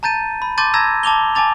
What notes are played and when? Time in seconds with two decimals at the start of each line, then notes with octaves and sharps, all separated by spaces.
0.03 A5 A#5 G6 A6 D#7
0.42 B5
0.58 A5 C6 D6 G6 A6 D#7
0.74 A5 A#5 E6 G#6 A#6
1.03 A5 D6 F7 G7
1.35 G#5 A5 D6 A6 F7